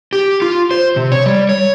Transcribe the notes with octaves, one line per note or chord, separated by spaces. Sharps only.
G4
F4
C5
C3
C#5
G3
C#5